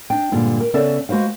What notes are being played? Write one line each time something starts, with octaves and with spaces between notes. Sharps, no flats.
D4 G5
G2 A#2 D3 G#3
A#4
C#3 B3 C#4 A4 D5 E5
G#3 F#4 B4 C5 F5